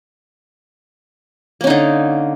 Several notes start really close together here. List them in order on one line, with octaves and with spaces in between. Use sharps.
A#3 C#4 D#4 D3